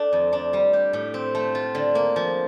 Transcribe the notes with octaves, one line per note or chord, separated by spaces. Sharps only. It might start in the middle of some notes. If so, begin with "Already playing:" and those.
Already playing: A3 D4
F2
D4
G3
G4
A2
C4
A3
F4
D3
A#3
F3